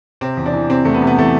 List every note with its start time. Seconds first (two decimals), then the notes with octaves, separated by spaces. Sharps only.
0.21 C3 C4
0.37 E2
0.46 D4
0.54 E3
0.70 C3 C4
0.85 E2 A3
0.94 B3
1.02 C3
1.07 B3
1.18 E3 A3